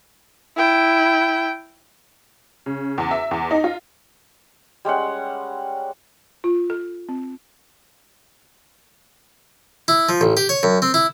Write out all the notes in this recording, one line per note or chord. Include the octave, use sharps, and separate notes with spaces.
E4 G5
C#3
E2
E5
E2
D#4
F4
G3 G#3 C#4 F#5
F4
A4
C4
E4
F3
A1
G4
C#5
F#2
C4
E4